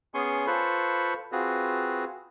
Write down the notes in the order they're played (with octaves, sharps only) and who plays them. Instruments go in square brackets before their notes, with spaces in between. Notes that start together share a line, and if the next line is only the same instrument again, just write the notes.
[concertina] B3 C#4 G#4 G#5 C6 C#6
F4 A4 B4 C5 B5 C#6
C4 F4 F#4 G#4 B4